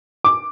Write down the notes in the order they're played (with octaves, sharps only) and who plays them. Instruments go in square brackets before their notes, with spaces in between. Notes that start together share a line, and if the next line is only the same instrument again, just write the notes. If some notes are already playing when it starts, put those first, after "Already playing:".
[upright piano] D6